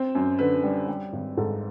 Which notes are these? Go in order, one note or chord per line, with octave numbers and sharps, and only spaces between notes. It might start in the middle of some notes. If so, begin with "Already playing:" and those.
Already playing: C4 C5
F#2
D3 B4
G3
G3
G#1
G#2 A4